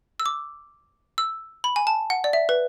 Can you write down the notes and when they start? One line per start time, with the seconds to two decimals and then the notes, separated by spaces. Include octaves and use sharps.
0.20 E6
0.26 D6
1.18 E6
1.64 B5
1.76 G#5
1.87 A5
2.10 F#5
2.24 D5
2.33 E5
2.49 B4